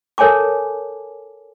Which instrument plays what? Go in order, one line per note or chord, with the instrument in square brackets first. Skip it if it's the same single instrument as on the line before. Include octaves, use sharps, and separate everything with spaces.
[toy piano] A4 A#4 C#5 G#5 A5 D6